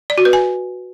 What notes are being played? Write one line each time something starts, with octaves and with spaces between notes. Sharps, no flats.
D5
F#4
B4
G#5